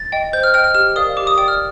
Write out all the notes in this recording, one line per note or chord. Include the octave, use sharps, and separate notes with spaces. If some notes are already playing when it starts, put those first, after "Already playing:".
Already playing: A6
D#5 G5
C5 G6
F6
D#5 G5 F6
F6
G4 F6
A#4 D5 F5 D#6
G4 D6
D#6
D5 G5 D#6
F6